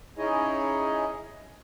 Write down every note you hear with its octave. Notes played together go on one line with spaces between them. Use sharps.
C#4 D#4 E4 G#4 C#5 D#5